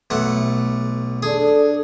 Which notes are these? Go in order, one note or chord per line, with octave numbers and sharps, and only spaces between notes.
B1 A3 F#5
D4 G#4 A4